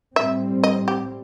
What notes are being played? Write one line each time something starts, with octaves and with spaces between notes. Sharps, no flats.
A2 G3 C4 E5
D#5
G4